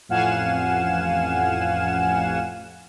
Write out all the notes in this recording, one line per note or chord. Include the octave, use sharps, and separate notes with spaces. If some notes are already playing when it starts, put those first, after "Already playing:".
A1 F2 F5 F#5 G#5 E7